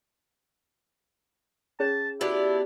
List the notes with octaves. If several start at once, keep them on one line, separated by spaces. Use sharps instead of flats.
C#4 G#4 C#5 A5
B3 D4 E4 F#4 G4